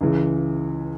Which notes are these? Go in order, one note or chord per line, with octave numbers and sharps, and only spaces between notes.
C#2 C#3 E3 G#3